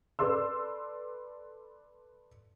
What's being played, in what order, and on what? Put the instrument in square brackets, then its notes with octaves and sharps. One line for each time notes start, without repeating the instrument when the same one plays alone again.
[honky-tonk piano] A4 B4 D5 C6 E6